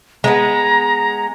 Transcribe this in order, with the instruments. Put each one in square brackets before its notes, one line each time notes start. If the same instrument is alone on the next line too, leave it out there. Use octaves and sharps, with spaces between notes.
[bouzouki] G#3 B3 [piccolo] A#5